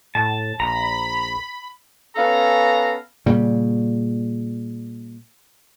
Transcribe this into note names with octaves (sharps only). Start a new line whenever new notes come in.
A2 A5
A#1 A#5 B5
B3 C#4 A4 F5 A#5
A#2 C#3 G3